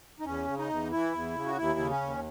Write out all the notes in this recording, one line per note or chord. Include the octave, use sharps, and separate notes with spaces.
D#4
E2 C#4
C#3
D#4
E2
E3 E4
E2
C#3
F#4
D#2 E4
C#3
C#4
D#2